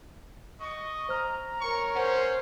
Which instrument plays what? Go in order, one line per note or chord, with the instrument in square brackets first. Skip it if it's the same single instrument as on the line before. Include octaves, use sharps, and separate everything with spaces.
[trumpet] D#5 [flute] C#6
[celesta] C5 F6 [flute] A#5
[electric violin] A#4 C#5 [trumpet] C#6
[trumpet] C#4 [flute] C5 [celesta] F#5